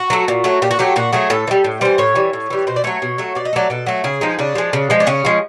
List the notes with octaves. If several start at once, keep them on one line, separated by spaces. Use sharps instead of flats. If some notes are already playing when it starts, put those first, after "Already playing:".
Already playing: F#4
F#3 A3
A#2
F#3 A3
A#2 G4
F#4
F#3 A3 G4
A#2 F#4
F#3 A3 G#4
A2 A4
E3
G3
A2
E3 G3 C5
A2 C#5
E3 G3
A2
E3 G3
B2 C5
D5
F#3 A3 C#5
B2
F#3 A3
B2 D5
D#5
F#3 A3 D5
B2 A4
F#3 A3
C#3 G#4
F3 G#3 D#4
C#3 D4
F3 G#3
C#3
F3 G#3
D4
C#3 C#4
F3 G#3